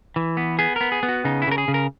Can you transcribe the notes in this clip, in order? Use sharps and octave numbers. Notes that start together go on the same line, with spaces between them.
E3
B3
B3 G#4
B3 A#4
G#4
B3
F#4
C#3 D#4
E4
C#3 A#4
G#4
C#3
A#4